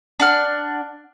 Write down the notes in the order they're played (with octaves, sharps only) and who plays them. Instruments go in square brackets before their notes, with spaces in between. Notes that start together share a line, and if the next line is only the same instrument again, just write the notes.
[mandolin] D4 F#5 F6